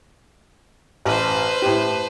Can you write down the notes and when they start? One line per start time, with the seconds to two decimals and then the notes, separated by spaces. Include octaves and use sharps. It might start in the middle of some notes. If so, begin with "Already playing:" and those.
1.05 A1 B4 C5
1.62 A2 G4